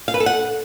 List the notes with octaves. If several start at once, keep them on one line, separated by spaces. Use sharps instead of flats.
F5
B4
A4
F#5